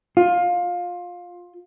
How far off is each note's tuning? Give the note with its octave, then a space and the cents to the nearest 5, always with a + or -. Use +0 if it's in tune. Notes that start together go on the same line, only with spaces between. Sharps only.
F4 +20